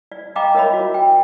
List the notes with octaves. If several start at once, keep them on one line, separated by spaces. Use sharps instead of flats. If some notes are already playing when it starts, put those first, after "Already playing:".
D5
D#5 F5 G5 A#5 B5 D6
A#4 C#5 D#5 E5 B5
F#4
G5